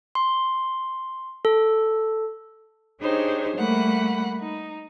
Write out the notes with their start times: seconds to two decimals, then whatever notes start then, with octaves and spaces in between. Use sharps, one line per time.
0.15 C6
1.45 A4
3.02 D4 D#4 G4 G#4 C5 C#5
3.55 G3 A3 A#3 F#5 B5
4.40 D#4